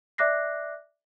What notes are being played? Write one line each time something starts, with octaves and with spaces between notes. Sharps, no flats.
D5 E5 D6 F#6 A#6 C7